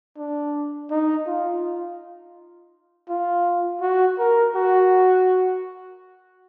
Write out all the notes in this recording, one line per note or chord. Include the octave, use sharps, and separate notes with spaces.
D4
D#4
F4
F4
F#4
A#4
F#4